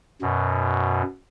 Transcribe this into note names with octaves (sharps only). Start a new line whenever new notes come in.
F#2 B2